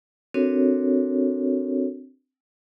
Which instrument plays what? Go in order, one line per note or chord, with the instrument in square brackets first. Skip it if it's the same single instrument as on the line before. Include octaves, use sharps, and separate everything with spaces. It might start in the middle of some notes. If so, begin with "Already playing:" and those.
[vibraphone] C4 D4 F#4 A4 A#4 C#5